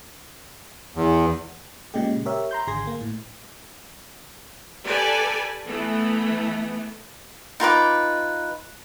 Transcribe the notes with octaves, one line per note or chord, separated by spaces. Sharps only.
E2
A#2 C#3 G#3 G4
G4 A#4 C#5 E5
A#5 C6 G6
G#1 D3 G#4 C6 G#6 A#6
A#3
A2
G4 A4 B4 D5 G#5 A5
E3 A3 B3
D#4 F4 B4 D6